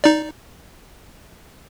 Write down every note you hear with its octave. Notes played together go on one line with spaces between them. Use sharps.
D#4 D5